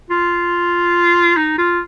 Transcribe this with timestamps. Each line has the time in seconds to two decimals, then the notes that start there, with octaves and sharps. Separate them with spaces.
0.10 F4
1.37 D#4
1.58 F4